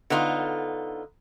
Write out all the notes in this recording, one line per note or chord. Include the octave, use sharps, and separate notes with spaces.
D3 B3 D#4 F4